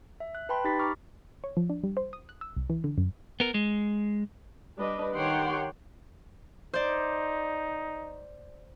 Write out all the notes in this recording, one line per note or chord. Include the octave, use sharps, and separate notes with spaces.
E5
F#6
B4 G5 A5 B5 C6
D#4 G4 B5 A6 B6
A#5 C#6 D6 F6
C#5
F3
D4
G3
C5
D#6
F#6
E6
C2
E3
D3
F#2
B3 A#4
G#3
G3 D4 B4 D#5
D#3 G4 C#5 F#5 G5 C6
D#4 C5 D5